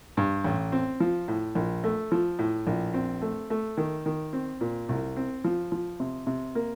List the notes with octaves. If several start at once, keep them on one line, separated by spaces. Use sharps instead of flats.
G2
A1
C4
F3
A2
A#1
A3
F3
A2
A#1
C4
A3
A3
D#3
D#3
C4
A#2
C2
C4
F3
F3
C3
C3
A#3